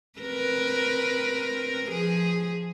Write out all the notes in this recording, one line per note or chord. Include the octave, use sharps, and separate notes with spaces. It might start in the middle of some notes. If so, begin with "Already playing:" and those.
C4 A#4 B4
F3 G#4